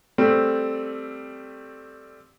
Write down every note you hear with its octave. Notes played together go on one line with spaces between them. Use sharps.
G3 A3 C4